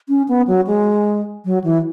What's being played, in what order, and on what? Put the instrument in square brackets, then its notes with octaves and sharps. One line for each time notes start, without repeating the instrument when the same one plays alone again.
[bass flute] C#4
B3
F#3
G#3
F#3
E3